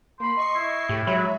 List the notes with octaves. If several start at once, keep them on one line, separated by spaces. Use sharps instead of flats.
A#3 B5 C6
D#5 C#6 C7
E4
A2 G4
F#3 G#3 C#5 E5 B5